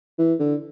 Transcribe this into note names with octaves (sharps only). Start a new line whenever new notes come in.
E3
D3